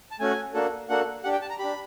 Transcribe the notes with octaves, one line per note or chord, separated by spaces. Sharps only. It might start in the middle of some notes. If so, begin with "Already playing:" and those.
A5
A3 C#4 F#4 G#5
A#3 D4 F#4 A4
A#3 D4 F#4 A4 F#5
D4 G4 F#5
G5
A5
A#5
D4 G4 B5